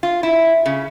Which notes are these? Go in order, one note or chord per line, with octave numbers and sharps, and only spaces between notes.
F4
E4
C#3